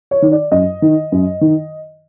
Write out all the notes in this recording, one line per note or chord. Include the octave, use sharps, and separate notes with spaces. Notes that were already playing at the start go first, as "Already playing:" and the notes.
C#5
D#3
D5
F#2 D#5
D#3
F#2
D#3